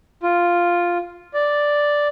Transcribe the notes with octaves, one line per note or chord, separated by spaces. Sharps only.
F4
D5